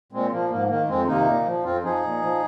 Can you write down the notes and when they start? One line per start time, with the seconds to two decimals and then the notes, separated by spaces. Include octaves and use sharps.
0.12 A#2 G#3 C4
0.32 F3 A#3
0.50 G#2 A#3
0.69 D#3 A#3
0.88 F2 G#3 C4
1.07 C3 D#3 A#3 D#4
1.26 A#2
1.45 F3
1.64 F2 C4 F4
1.83 F3 D#4 G#4
2.02 A#2
2.22 F3